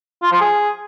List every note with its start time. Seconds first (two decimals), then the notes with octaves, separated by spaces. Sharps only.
0.22 F4
0.32 F3
0.41 G#4